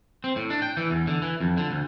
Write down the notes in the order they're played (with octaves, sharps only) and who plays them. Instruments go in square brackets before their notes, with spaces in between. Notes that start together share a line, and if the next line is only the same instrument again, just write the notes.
[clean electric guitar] C4
A2
D4
G5
E3
E2
D3
E3
F2
D3
D2